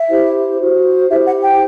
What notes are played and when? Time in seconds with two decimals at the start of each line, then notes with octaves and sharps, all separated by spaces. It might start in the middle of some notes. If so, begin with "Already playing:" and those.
Already playing: E5
0.10 E4 G4 C5
0.60 F#4 C5
1.09 E4 G4 C5 E5
1.27 F#5
1.43 G5